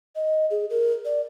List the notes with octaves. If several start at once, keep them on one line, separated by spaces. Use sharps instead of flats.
D#5
G#4
A#4
D5